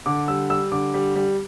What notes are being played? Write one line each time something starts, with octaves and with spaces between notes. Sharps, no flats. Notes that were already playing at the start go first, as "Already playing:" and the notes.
D3 D6
G3 E6
G3 E6
D3 D6
G3
G3